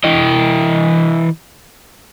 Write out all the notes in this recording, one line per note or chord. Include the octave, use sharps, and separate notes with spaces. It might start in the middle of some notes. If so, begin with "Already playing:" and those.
E3 D#5